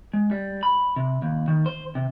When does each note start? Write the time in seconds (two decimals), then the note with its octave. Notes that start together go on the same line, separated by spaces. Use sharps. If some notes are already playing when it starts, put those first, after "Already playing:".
0.14 G#3
0.31 G3
0.63 B5
0.96 C3
1.22 D#2
1.48 D#3
1.66 C5
1.95 C3